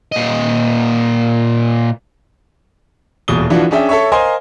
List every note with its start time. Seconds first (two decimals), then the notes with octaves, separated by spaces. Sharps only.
0.12 A#2 D#5
3.28 D#1 E2 B2 D#6 G7
3.50 E3 F3 D4 F4 F#4
3.71 C#4 D4 G#4 D5 E5 G5
3.89 A4 C#5 E5 C#6
4.12 A#4 C5 D#5 F5 G#5 C6